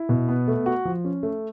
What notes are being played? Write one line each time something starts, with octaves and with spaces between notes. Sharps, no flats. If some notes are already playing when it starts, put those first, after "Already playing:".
Already playing: E4
B2
B3
A3
F#4
F3
C#4
A3